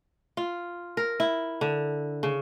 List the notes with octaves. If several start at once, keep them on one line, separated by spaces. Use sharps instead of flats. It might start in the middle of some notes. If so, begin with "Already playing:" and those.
F4
A#4
E4
D3
C#3